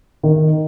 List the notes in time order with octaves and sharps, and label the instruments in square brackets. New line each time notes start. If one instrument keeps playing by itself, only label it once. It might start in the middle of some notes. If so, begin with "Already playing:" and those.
[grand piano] D#3